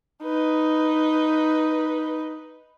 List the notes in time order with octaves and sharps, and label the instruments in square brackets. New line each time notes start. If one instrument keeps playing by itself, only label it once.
[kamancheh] D#4 B4